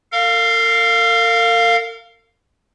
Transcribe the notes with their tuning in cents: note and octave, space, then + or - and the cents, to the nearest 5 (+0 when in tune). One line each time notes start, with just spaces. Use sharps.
A#4 -45 F5 +0